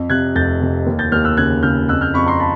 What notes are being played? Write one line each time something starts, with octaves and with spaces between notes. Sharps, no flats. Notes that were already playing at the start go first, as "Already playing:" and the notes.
Already playing: F2
C3 F#6 G#6
F1 G6 A6
C3
D#2
G6 A6
D#2 F6 G6
E6 F#6
C#3 F#6 G#6
C#3 F6 G6
F2 E6 F#6
F6 G6
F2 B5 C#6
A#5 C6
A5 B5